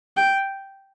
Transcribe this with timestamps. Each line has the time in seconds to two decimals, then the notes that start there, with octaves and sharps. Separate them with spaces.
0.17 G5